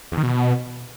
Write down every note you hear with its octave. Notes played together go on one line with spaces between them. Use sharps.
E2
D#3
B2